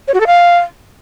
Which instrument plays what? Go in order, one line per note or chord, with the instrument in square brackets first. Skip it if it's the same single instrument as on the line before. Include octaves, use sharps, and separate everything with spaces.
[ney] C#5
F#4
A4
F5